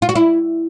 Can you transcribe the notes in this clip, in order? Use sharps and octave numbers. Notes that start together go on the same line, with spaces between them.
F4
F#4
E4